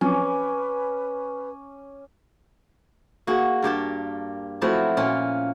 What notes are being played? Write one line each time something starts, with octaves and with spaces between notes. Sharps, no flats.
F3 F#3 C4 C#4 B4 G#5 D6
A#3 F#4 G#4
G2 A#3 G4 A5
F3 F#3 A3 C4 E4 F#4
A#2 C#4 F4